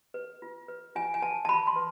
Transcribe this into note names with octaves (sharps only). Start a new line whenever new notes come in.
B4
F4
B4
F4 G#5
G#5
B4 A5
A5
F4 B5
C6
B4